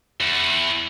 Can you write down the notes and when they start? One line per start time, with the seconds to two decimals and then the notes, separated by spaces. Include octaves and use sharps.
0.21 E2